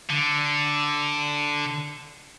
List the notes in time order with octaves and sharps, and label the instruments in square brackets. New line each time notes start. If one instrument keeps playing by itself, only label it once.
[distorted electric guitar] D3